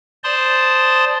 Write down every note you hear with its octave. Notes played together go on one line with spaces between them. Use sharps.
C5 D5 A5 C6 D#6